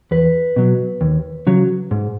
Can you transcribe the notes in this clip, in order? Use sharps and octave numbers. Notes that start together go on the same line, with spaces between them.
E2 B4
B2 F#3
D#2
C#3 F#3
G#2